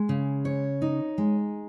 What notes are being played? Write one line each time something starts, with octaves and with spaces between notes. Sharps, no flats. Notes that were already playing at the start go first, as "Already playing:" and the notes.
Already playing: G#3
C#3
C#5
D#4
G#3